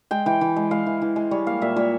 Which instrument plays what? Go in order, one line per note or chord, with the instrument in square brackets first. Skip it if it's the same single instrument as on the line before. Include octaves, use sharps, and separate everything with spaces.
[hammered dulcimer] G#3 G5
E3 G5
E3
G#3
G#3 F5
E3
E3
G#3
G3 C#5
A#3 F5
A#2 E5
A#2 C#5